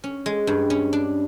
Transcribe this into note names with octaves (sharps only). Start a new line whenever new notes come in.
C#4
G#3
G2
C#4
D4